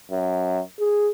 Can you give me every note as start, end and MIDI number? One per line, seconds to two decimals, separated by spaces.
0.11 0.60 42
0.80 1.10 68